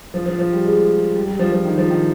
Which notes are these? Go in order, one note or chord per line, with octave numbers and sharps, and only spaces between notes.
F3
F3
F3
G3
G#3
G3
G3
F3
F3
D#3
F3
D#3